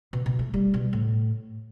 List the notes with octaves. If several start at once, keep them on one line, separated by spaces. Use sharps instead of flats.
B2
B2
A3
G3
B2
A2